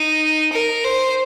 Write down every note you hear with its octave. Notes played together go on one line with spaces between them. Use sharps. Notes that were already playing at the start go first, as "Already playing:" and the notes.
Already playing: D#4
A#4
C5